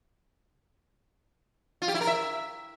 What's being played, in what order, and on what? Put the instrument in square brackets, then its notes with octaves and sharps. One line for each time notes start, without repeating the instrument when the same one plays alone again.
[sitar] F4
G4
E4
A#4
E5